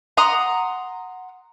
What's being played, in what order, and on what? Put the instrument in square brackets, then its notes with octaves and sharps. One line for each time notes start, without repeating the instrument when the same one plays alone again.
[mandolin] F#5 A#5 C6 D#6